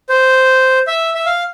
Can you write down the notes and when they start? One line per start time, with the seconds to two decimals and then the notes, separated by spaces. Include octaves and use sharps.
0.09 C5
0.87 E5
1.14 E5
1.26 F5